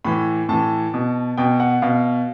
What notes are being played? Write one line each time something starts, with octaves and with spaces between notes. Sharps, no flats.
A2 E3 B5
A2 E3 A5
B2
B2 G5
F#5
B2 F5